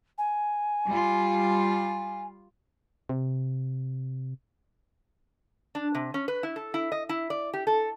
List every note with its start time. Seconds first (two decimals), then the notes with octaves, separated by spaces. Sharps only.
0.18 G#5
0.86 G3 F4
3.09 C3
5.75 D4
5.95 C3
6.14 C#4
6.28 B4
6.43 E4
6.56 A4
6.74 E4
6.92 D#5
7.09 E4
7.30 D5
7.54 G4
7.67 A4